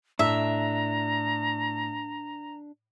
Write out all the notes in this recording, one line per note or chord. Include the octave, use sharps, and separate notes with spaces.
A2 D4 E5 A#5